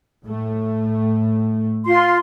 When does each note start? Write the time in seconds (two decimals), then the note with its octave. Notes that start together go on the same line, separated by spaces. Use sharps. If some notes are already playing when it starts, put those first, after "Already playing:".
0.24 A2 A3
1.87 F4 C6